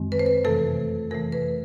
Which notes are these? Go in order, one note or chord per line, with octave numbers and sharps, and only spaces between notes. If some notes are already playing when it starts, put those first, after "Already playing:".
Already playing: F#2 D#3 G#3 C4
B4
C5
B4
F2 C3 E3 A3 A4
F2 C3 E3 A3 A#4
B4